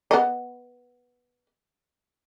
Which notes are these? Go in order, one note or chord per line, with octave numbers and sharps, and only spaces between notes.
B3 D#5